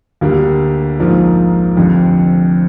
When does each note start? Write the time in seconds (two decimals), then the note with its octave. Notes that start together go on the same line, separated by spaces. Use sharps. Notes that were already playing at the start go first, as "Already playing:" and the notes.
0.21 D2 D3 G3 A#3
0.99 A#1 G#2 F3 A#3
1.77 F1 F2 D3